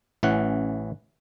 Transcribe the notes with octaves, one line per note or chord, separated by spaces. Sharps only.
A1 E3 C#4 F#5